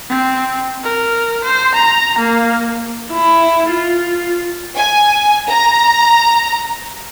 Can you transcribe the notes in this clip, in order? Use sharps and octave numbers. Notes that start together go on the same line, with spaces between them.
C4
A#4
C5
A#5
A#3
E4
F4
G#5
A#5